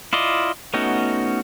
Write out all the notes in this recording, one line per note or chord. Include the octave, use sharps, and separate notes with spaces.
E4 F4 D5 D#5
A3 B3 C#4 D#4 F#4